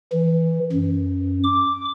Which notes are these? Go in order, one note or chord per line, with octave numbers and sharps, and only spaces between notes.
E3
F#2
D6